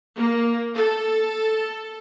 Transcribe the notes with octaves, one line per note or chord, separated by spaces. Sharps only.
A#3
A4